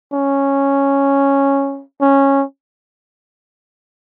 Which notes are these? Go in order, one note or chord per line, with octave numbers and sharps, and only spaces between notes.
C#4
C#4